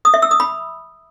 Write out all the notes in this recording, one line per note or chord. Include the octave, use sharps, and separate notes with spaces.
D#6
E5
E6
D#6
B5